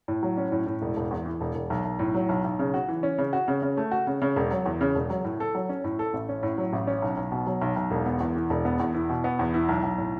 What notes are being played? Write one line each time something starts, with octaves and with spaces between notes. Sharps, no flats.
A2
F#3
C#4
A2
A2
E1
E1
E2
E3
E1
E1
B1
B1
A2
F#3
B1
B1
C#3
F#4
E3
C#4
C#3
F#4
C#3
C#3
A3
F#4
C#3
C#3
E1
F#3
E2
C#3
E1
F#3
A2
A4
F#3
C#4
A2
A4
A1
C#4
A2
F#3
A1
C#4
B1
B1
B2
F#3
B1
B1
E1
B3
E2
E3
E1
B3
E2
E4
B2
B3
E2
E4
B1
B1
A2